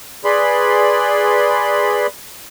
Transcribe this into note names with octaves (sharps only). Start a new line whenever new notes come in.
G#4 B4 D5 B5 C6